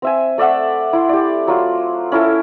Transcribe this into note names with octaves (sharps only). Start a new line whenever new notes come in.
C4 E5 G#5
A3 D5 E5 F#5
E4 C6
G4 D5
F#3 F4
C#4 E4 A4 A#4